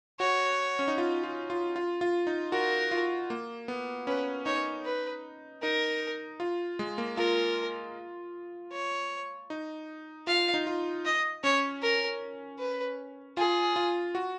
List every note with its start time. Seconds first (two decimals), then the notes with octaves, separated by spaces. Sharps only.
0.20 F#4 C#5
0.79 C#4
0.88 D#4
0.98 F4
1.24 F4
1.50 F4
1.76 F4
2.01 F4
2.27 D#4
2.52 F#4 A#4
2.91 F4
3.30 A#3
3.68 B3
4.07 C#4 B4
4.46 D#4 C#5
4.85 B4
5.62 D#4 A#4
6.40 F4
6.79 G#3
6.98 A#3
7.17 F4 A#4
8.72 C#5
9.50 D#4
10.27 F4 F5
10.54 D#4
10.67 F4
11.05 D#5
11.44 C#4 C#5
11.82 A#4
12.59 B4
13.37 F4 G#4
13.76 F4
14.15 F#4